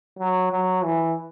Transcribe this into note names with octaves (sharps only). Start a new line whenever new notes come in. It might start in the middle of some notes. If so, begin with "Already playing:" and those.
F#3
F#3
E3